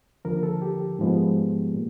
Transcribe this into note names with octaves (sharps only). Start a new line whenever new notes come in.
D#2 D3 F3 A#4
A4
G4
G#2 F3 G#3 B3
A#2